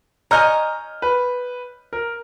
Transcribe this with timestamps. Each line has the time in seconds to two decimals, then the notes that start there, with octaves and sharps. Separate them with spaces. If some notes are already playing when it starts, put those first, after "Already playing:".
0.31 C#5 D#5 G#5 A#5 F6 G6
1.02 B4
1.93 A#4